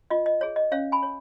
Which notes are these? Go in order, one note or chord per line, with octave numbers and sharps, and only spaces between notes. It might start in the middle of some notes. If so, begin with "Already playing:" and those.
F4 D#5
D#5
G#4 C#5
D#5
C#4 C#5 F5
G#5 B5
C#5